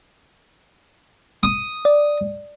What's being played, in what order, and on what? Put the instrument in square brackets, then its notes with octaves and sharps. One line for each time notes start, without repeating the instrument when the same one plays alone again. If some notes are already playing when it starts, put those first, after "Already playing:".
[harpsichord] D#6
[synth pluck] D5